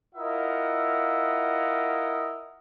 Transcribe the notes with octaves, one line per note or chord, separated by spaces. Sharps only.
E4 F4 A#4 D#5 E5 F#5